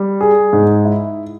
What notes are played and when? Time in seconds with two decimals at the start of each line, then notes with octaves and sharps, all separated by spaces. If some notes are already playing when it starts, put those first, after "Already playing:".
Already playing: G3
0.21 G#4
0.53 G#2
0.85 E4